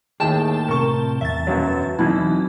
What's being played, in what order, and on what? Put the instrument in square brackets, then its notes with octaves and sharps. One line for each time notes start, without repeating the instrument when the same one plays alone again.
[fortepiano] D#2 A2 [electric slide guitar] G#4 [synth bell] G5 A5 E7
[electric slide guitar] A2 C3 [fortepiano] A#4 C#6
[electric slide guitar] E2 [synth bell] E5 A6
[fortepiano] B1 F#2 F#3
[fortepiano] E2 B2 [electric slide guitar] F#3 C4 D#4 [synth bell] E4